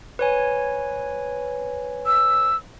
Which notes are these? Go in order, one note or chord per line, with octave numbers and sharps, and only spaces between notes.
B4 C#5 G#5
E6